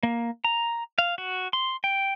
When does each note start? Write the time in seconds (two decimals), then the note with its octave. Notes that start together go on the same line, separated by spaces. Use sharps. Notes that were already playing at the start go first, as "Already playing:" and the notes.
0.03 A#3
0.45 A#5
0.98 F5
1.18 F#4
1.53 C6
1.84 G5